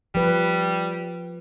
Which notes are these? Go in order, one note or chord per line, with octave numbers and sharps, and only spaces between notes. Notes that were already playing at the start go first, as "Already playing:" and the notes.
F3 G3 B4